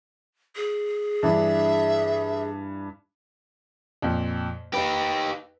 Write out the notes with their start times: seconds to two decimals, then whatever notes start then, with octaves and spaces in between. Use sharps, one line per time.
0.56 G#4
1.23 G2 E3 D4 E5
4.02 F2 A#2
4.74 D#4 G4 B4